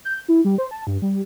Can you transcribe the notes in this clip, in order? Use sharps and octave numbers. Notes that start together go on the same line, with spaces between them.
G6
E4
G3
C5
A5
G2
G3